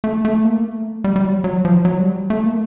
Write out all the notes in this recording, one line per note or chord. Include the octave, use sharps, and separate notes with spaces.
A3
A3
A#3
A3
G3
G3
F#3
F#3
F3
F#3
G3
A3
A#3